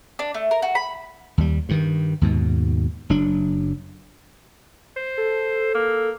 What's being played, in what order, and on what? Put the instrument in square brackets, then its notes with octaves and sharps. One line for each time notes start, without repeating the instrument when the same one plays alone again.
[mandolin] D4
A3
A#4
F#4
B5
[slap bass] D#2 G3
G2 D#3
D#2 G#2 B2
F#1 F#3 D4
[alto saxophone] C5
[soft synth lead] A4
[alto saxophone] A#3